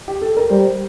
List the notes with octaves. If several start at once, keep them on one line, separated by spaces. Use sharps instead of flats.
G4
A4
A#4
G3 C5